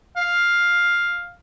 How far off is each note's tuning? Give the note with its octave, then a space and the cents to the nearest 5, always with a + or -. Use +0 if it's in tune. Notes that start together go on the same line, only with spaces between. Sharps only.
F5 +5